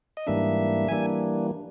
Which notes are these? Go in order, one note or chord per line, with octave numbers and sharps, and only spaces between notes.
D#5
G#2 E3 G3 A#3 D4 E5
E3 G3 A#3 D4 G#5